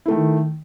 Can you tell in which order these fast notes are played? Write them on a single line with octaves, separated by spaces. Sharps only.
E4 A3 D#3